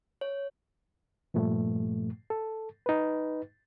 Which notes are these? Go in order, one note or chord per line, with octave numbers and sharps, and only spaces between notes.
C#5
G2 A#2 F3 A3
A4
D#4 B4